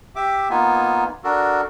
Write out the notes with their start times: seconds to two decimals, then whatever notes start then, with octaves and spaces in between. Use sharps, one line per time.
0.16 G4 E5 D6
0.50 A#3 B3 D#4 F4 G#5
1.24 D4 F#4 A4 A#4